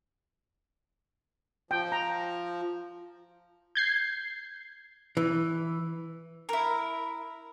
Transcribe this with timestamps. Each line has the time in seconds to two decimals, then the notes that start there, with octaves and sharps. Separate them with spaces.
1.71 F3 G5
1.92 A#5
3.75 G6 G#6 C7
5.17 E3
6.49 E4 A#4